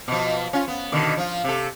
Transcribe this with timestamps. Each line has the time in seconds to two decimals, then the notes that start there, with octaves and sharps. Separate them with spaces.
0.08 B2 F3
0.53 C#4 F4
0.68 B3
0.92 B2 D3 D#3
1.17 F3 F4
1.44 C3 A4